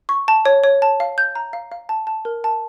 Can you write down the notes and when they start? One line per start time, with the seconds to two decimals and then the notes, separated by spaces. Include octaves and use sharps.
0.09 C#6
0.28 A5
0.46 C#5
0.64 C#5
0.82 A5
1.00 F5
1.18 G6
1.35 A#5
1.53 F5
1.72 F5
1.89 A5
2.07 A5
2.25 A#4
2.44 A5